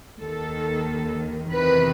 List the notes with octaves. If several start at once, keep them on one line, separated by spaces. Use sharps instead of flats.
D#2 D#3 A4
E2 C3 D#3 B4